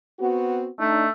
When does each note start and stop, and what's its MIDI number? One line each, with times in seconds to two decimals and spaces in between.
0.19 0.68 59
0.19 0.68 60
0.19 0.68 66
0.80 1.09 57
0.80 1.05 62
0.80 1.05 63